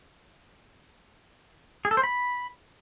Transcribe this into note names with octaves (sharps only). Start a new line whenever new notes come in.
G#4
A4
C5
B5